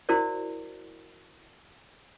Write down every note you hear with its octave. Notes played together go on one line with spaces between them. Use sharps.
E4 F#4 A#4 C5 D5